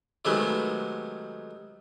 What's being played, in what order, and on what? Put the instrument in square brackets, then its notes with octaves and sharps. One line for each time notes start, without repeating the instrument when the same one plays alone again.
[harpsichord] C3 D#3 F#3 G#3 A3 B3